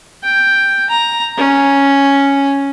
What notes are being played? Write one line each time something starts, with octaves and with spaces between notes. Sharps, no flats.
G5
A#5
C#4